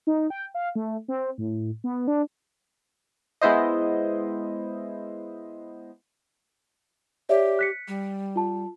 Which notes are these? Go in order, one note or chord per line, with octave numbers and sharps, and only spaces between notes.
D#4
G5
F5
A3
C4
A2
B3
D4
G#3 B3 E4 C5 D#5
G4 C#5 D5 E5
F#6 B6 C#7
G3
F4 A5